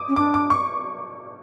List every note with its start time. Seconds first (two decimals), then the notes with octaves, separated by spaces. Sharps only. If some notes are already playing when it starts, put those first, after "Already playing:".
Already playing: D6 D#6
0.08 C#4
0.16 D4 D6
0.34 D6
0.50 C#6